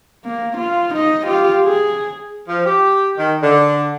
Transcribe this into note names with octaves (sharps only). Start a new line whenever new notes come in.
A#3
F4
D#4 D#5
F4 G4
G#4
F3
G4
D#3
D3